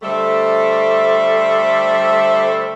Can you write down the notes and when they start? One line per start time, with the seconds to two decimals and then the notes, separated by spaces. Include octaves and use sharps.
0.02 D3 G3 A3 A4 C5 E5